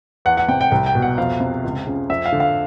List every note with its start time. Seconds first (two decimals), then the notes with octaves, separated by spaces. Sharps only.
0.25 E2 F#5
0.37 F#5
0.48 C3 G5
0.61 G5
0.71 C2 G5
0.86 G5
0.95 B2
1.02 F#5
1.18 F2 F5
1.40 C3
1.64 C#2
1.87 C#3
2.10 F2 E5
2.26 F5
2.33 D3
2.40 F5